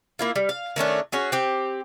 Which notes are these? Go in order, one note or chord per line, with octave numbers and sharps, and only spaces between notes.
A#3 E4 F4
G3
F5
D#3 A3 C#4 D4
C#4 F#4 G#4
C4 G4